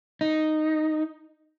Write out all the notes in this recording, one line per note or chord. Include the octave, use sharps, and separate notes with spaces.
D#4